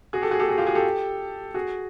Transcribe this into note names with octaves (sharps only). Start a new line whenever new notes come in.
F#4 G#4
G4 A4
F#4 G#4
G4 A4
F#4 G#4
F4 G4
F#4 G#4
G4 A4
F#4 G#4